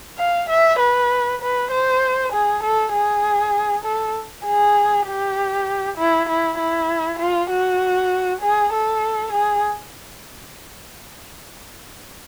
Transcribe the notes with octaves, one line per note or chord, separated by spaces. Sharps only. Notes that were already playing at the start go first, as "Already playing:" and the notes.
F5
E5
B4
B4
C5
G#4
A4
G#4
A4
G#4
G4
E4
E4
E4
F4
F#4
G#4
A4
G#4